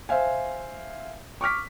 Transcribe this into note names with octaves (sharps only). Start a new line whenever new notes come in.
C5 E5 F5 G#5
C#6 D6 F6 B6